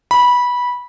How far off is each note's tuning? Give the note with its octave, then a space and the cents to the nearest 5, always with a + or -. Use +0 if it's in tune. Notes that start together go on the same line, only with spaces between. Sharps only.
B5 -15